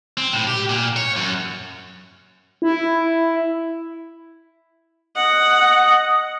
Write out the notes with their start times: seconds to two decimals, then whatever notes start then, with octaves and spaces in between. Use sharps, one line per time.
0.17 C4
0.33 A2
0.47 G4
0.69 A#2
0.96 C#5
1.17 F#2
2.62 E4
5.16 D#5 F#5